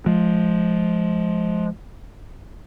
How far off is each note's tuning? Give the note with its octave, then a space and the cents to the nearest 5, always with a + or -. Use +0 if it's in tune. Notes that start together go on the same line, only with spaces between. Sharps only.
F3 +0 G#3 +20